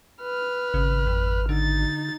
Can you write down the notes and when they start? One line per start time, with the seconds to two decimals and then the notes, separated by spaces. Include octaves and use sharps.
0.22 B4 F6
0.74 G#1 C#3
1.07 F2
1.49 D3 D#4 A6